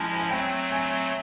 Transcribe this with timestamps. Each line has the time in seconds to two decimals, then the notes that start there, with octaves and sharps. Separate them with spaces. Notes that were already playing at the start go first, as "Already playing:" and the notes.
Already playing: F3 G#3 C#4 E4 G#5 A5
0.16 G#5
0.30 F#3 A3 C4 G5
0.72 G#5